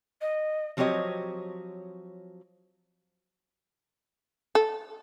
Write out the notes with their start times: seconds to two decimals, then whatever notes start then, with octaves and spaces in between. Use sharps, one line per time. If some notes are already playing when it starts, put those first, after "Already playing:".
0.21 D#5
0.77 F3 F#3 C4 G4 C#5 D#5
4.55 A4